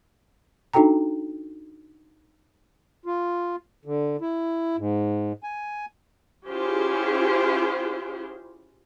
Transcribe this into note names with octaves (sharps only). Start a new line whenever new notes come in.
D4 D#4 F#4 A4 G5 A#5
F4
D3
E4
G#2
G#5
C#4 E4 F4 G4 G#4 C5